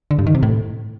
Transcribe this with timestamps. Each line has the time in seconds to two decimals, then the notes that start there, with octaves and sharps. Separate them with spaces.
0.11 D3
0.19 G2
0.27 D#3
0.35 C3
0.43 A2